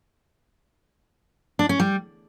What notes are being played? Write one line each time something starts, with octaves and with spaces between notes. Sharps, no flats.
D4
C#4
G3